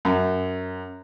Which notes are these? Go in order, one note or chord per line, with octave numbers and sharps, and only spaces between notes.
F#2